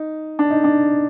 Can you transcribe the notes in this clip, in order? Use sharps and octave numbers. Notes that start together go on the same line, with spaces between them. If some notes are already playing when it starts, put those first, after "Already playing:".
Already playing: D#4
D4
D#4
D4